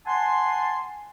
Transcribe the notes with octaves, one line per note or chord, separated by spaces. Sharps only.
F#5 G#5 A5 C6